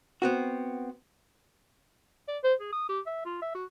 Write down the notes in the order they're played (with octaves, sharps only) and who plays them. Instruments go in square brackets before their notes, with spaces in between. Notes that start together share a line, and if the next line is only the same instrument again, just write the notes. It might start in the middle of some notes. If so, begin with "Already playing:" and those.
[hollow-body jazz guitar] B3 C4 F#4
[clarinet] D5
C5
G#4
D#6
G4
E5
F4
E5
F#4